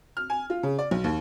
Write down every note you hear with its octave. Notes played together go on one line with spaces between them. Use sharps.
F6
G#5
F4
C#3
D5
B1
D#2